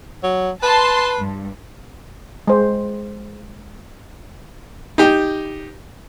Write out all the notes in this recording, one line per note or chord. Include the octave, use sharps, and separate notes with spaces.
F#3
B4 A5 C6
G2
G#3 C5
D#4 G4